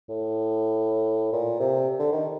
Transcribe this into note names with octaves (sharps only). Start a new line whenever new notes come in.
A2
A#2
C3
D3
D#3